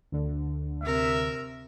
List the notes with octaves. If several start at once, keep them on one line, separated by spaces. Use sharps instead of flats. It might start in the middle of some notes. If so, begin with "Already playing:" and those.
D2 D3
C3 A#4 E5